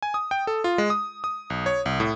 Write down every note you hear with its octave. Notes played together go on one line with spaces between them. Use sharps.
G#5
D#6
G5
A4
F4
G#3
D#6
D#6
B1
C#5
C2
A2